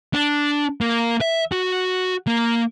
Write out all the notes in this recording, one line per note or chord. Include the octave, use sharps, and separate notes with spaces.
D4
A#3
E5
F#4
A#3